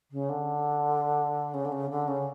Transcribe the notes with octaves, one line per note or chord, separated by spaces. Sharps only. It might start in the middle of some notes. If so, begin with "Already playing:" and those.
C#3
D3
C#3
D3
C#3
D3
C#3